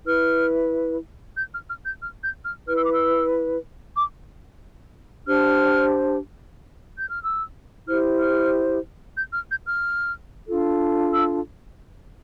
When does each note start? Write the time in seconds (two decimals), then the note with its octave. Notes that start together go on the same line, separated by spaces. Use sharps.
0.05 E4 B4 F6
1.36 G6
1.53 F6
1.69 F6
1.85 G6
2.01 F6
2.23 G6
2.45 F6
2.67 E4 B4 F6
2.76 E6
2.84 D6
2.93 E6
3.96 D6
5.26 D4 G4 C5 F6
6.97 G6
7.09 F6
7.23 E6
7.87 E4 G4 C5 F6
8.20 F6
9.17 G6
9.34 F6
9.51 G6
9.66 F6
10.49 D4 F4 A4
11.13 E6